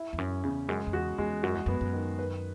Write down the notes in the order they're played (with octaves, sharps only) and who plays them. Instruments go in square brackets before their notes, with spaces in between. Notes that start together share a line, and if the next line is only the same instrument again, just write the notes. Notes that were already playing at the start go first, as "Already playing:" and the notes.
Already playing: [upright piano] E4
[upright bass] E2
[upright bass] F#2 [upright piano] C#4
[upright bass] E2 [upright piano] C#3
[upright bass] F#2 [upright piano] G#3
[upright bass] F#2
[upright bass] E2 [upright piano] F#4
[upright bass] E2 [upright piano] G#3
[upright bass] F#2 [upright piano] F#4
[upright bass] E2
[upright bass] F#2 [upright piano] B3
[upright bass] F#2
[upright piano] D#3
B4